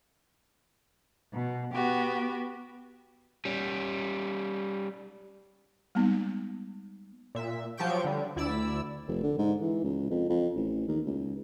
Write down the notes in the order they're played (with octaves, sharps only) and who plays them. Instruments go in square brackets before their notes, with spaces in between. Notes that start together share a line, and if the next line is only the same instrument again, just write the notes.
[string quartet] B2
B3 F#4 G4
[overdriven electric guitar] G3 C#4
[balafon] G3 G#3 A#3 B3 D#4
[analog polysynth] A#2 E5
F3 F#3 G4 C#6 G6 D7
D3 G3
D2 E4 D5 E6
[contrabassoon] F1
D3
G#2
E3
C#2
F2
F2
A1
D#2
C#2